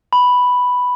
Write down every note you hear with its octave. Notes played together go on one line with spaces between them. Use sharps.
B5